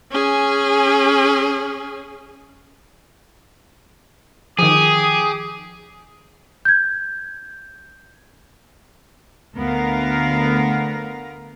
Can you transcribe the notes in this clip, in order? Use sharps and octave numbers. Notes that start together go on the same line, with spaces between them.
C#4 G#4
D#3 F3 G4 G#4 D6 D#6
G6 G#6
D2 B3 A#4 F5